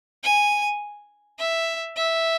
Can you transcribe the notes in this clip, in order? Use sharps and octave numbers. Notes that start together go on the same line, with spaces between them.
G#5
E5
E5